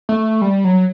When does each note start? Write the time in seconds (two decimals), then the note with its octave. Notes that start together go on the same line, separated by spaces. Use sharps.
0.09 A3
0.41 G3
0.64 F#3